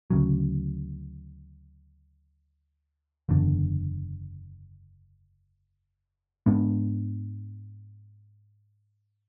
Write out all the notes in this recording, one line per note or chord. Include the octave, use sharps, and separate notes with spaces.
D2 C#3 F#3
F#1 E2 D3
G#2 G#3 B3 D4